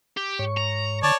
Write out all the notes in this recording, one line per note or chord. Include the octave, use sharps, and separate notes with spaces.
G4
G#2 C#5 C#6
A#5
D3 C#5 D5 A5